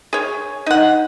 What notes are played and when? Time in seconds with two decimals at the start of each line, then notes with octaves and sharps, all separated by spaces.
0.13 G#4 C#5
0.66 D#4 F#5